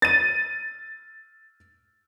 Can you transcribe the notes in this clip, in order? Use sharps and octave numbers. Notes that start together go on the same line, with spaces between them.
A6 D#7